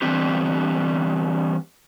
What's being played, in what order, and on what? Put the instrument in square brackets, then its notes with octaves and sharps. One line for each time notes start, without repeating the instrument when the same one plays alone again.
[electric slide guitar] D3 E3 G3 B3 C4 G4